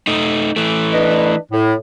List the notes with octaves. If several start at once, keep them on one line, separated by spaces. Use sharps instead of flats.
A3 D#4
E3 A3
D4 B4 D#5
A2